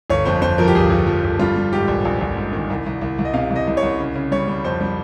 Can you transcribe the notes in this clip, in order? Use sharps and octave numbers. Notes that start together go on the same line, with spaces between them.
G1 C#5
F2 C5
F2 C5
F3 A#4
G4
G1 G#4
G1
F3
G1
G3 F4
G3
G#2 G4
A#1
A#1
A#1
G#2
D#3
C2
C2
C2
C2
D#5
C3 F5
C2
D#5
C2
C#5
C2
C#3
C#3
G3 C#5
G3
F2 C5
G3